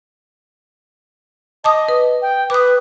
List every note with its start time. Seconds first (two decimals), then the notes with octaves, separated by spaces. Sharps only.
1.64 D#5 A5 D6 D#6
1.89 B4
2.22 G5
2.50 B4 D6 D#6